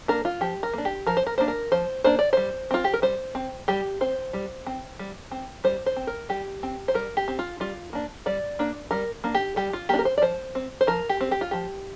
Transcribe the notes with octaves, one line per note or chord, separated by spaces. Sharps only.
A#3 D4 A#4
F4
F3 G4
A#4
A#3 D4
G4
F3 A#4
C5
A#4
A#3 D4 C5
A#4
F3 C5
A#3 D4 C5
D5
G3 C5
C4 F4
G4
A#4
G3 C5
C4
G3 G4
C4 C5
G3
C4
G3
C4
G3 C5
C5
C4
A#4
G3 G4
C4
C5
G3 A#4
G4
C4
F4
G3 F4
A#3 D4
G3 D5
A#3 D4
G3 A#4
A#3 D4
G4
G3 G4
F4
A#3 D4 G4
A#4
C5
D5
F3 C5
C4
C5
F3 A#4
G4
C4
G4
F4
F3 G4